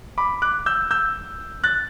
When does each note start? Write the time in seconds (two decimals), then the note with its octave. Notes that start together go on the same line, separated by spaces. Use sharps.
0.18 B5 D6
0.42 D6 F#6
0.66 E6 G6
0.91 E6 G6
1.64 F#6 A6